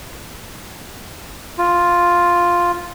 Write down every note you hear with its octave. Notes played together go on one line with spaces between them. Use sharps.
F4